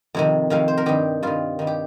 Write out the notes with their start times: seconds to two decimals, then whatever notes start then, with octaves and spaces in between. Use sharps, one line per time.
0.15 F2 C3 D#3
0.50 F2 C3 D#3 F5
0.68 C5
0.77 A#4
0.86 G2 D#3 G4
1.23 G2 D#3 F4
1.59 G2 D#3
1.67 G4